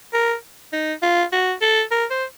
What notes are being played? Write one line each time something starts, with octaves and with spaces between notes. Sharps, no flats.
A#4
D#4
F4
F#4
A4
A#4
C5